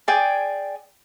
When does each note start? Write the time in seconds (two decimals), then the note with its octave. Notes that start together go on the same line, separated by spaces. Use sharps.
0.08 G#4 D5 G5 G#5